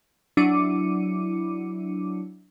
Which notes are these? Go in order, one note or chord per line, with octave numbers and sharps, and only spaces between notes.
F#3 D4 E4 D6 C#7 D#7